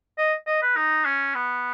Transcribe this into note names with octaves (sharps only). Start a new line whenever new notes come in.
D#5
D#5
B4
D#4
C#4
B3